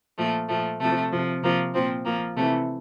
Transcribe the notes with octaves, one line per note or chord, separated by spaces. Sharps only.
A#2 F3 A3
A#2 F3 A3
C3 F3 A3
C3 F3
C3 F3 A#3
A#2 F3 C4
A#2 F3 A#3
C3 E3 A3